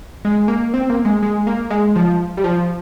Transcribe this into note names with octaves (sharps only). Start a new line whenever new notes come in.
G#3
A#3
C4
A#3
G#3
G#3
A#3
G#3
F3
G3
F3